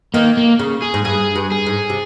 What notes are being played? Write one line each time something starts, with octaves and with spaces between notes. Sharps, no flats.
D#3 A#3
A#3
C#3
G#4
G#2
G2 G#4
G2
G#4
G#2
C3